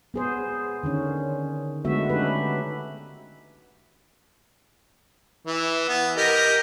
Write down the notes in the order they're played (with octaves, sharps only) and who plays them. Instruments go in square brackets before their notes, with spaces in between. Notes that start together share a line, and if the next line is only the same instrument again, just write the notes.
[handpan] B3 G#4 C5
D3 D#3 C#4
D3 G#3 A3 B3 F#4 E5
C#4 D#4 G4 B4
[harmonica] E3
B3
G4 A#4 D#5